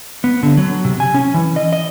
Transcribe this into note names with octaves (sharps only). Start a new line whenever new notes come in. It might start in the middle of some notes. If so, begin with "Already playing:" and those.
B3
D3
F#3
C3
G#5
C#4
E3
D#5
D#5